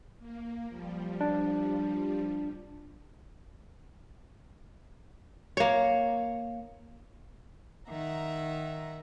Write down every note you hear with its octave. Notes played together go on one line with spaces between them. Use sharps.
A#3
F3 G3
D4
A#3 C#5
D#3 E5 F#5 A#5